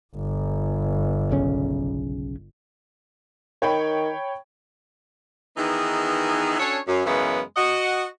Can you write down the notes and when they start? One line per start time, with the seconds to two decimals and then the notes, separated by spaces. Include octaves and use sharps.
0.16 G1
1.31 B1 C#3 C#4
3.62 D#3 C#5 G5 B5
5.57 D#3 E3 B3 D#4 G#4
6.59 C#4 D4 F#4 A4 C#5
6.87 F#2
7.06 F#2 C#3 E3 F#3 G#3 B3
7.57 F#4 D#5 F#5